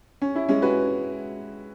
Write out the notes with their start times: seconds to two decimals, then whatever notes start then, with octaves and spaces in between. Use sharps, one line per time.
0.22 C#4
0.35 E4
0.49 G#3 C#4
0.62 F#4 B4